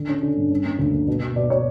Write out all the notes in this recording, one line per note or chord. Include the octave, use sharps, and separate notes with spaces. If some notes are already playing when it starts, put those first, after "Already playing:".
Already playing: D3
C#4
D3
G2
C#4
A#3
D2
A#3
B2
B2
B2 D5
B2 C#5